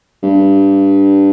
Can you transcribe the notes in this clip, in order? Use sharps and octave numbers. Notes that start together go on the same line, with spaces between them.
G2